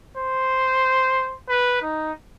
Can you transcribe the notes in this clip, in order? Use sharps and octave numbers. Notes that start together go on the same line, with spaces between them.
C5
B4
D#4